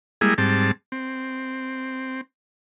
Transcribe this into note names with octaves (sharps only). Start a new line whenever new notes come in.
G3 G#3 A#3 E4 G#4
G#2 G3 C4 A5
C4